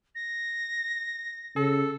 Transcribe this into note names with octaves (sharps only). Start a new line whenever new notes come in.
A#6
C#3 A4